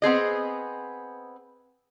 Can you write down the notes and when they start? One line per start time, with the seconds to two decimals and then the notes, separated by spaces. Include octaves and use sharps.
0.02 B3 C4 G#4 D#5